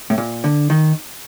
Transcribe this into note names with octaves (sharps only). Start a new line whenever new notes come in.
A2
A#2
D3
D#3